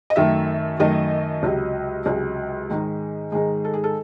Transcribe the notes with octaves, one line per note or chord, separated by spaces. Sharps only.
D#5
F#2 D#3 A3 E5
F#2 D#3 A3 D#5
C#2 C3 F#3
C#2 C3 F#3 G#4
G#2 D#3 G#3 D#4
G#2 D#3 G#3 D#4 G#4
A4
G#4
A4